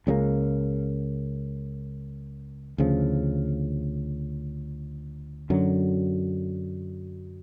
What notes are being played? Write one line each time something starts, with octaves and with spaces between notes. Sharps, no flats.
C#2 C#3 F#3 A#3
D2 C#3 F3
F#2 D3 F#3